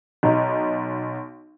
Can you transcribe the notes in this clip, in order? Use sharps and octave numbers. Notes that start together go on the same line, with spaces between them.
B1 D#4